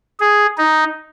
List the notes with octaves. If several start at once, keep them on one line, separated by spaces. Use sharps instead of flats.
G#4
D#4